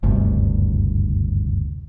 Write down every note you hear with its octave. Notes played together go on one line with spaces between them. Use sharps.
F#1 D2 G2 C3